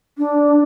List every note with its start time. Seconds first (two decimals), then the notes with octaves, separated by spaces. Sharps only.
0.18 D4